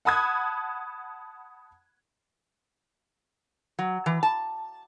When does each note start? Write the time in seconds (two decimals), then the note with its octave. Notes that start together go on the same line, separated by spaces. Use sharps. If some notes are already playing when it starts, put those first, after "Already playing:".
0.05 F#5 A5 B5 D#6 F#6 G#6
3.79 F#3
4.06 E3
4.23 A5